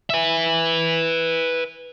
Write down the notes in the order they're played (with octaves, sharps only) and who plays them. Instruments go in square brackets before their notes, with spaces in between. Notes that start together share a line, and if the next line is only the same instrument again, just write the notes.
[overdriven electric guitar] B4 E5